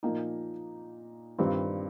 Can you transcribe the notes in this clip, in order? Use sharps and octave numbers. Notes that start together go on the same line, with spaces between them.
A#2 F3 A#3 D#4
G2 D#3 G3 C4 F4